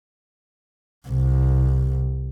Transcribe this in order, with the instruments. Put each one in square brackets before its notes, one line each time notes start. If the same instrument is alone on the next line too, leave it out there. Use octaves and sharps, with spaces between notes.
[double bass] C2